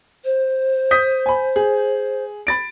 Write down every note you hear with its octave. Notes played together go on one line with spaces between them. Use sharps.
C5
D#6 G6 B6
G#5 B5
G#4
B5 A6 D7